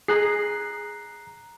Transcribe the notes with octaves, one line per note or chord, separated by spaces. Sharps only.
G#4 A#5 F#6 C7